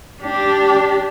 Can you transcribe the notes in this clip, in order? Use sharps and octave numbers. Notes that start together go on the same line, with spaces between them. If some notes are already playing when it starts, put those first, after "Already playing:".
D4 G4